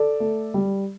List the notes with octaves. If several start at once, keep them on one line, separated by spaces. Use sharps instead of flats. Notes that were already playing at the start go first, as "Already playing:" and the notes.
Already playing: A4 D5
A3
G3